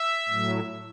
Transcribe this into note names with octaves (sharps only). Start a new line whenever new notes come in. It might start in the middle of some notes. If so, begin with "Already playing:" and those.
Already playing: E5
A2 F#3